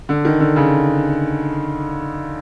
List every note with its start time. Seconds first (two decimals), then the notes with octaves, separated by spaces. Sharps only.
0.09 D3
0.25 D#3
0.40 D3
0.56 C#3